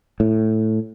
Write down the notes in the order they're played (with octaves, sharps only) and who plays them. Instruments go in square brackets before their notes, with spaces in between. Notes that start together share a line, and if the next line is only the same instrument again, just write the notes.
[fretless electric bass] A2